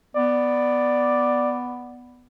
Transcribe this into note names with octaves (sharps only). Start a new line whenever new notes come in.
B3 D5